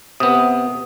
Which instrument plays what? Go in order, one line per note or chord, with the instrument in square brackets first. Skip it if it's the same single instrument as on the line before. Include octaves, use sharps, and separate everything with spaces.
[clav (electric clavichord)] C3 B3 [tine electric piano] D#6